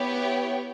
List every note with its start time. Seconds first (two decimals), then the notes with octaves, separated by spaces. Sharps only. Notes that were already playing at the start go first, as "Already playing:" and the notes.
Already playing: B3 E4 G4 C#5 G5